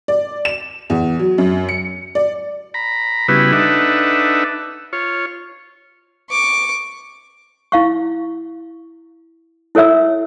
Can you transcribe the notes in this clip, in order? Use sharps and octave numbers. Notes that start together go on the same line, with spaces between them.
D5
E7
E2
F#3
F#2
C#7
D5
A#5 B5
C#3 G3 B3 E4 F#4 B4
D4 D#4 A4 B4 E5 F#5
F4 C#5
C#6 D6
E4 F5 C#6
E4 A4 C#5 E5 E6